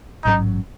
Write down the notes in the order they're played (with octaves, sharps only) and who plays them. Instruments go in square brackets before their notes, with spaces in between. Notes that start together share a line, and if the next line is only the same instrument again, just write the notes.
[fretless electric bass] A1 G#2 F#3 C#4 [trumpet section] D#4